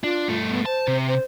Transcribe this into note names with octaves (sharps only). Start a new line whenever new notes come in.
D4 F4
G2 A3
B3
C5 A5
C3
C5